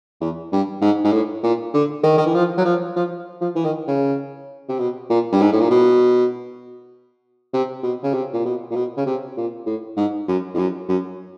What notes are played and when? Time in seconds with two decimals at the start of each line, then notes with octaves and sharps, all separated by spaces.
0.21 E2
0.52 G2
0.82 G#2
1.04 G#2
1.12 A2
1.43 A#2
1.74 D3
2.04 D#3
2.18 D#3
2.26 E3
2.34 F3
2.57 F#3
2.65 F3
2.96 F3
3.41 F3
3.56 E3
3.64 D#3
3.87 C#3
4.69 C3
4.79 B2
5.10 A#2
5.32 G2
5.41 G#2
5.52 A2
5.61 A#2
5.70 B2
7.53 C3
7.83 B2
8.03 C#3
8.14 C3
8.33 A#2
8.45 B2
8.71 A#2
8.75 B2
8.97 C#3
9.06 C3
9.37 A#2
9.66 A2
9.97 G#2
10.28 F#2
10.54 F2
10.58 F#2
10.89 F#2